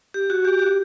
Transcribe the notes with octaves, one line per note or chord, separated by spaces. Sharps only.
G4
F#4
G4
G4